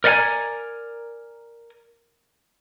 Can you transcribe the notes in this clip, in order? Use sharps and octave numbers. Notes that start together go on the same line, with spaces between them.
A#4 D5 D#5 F#5 G#5 A#5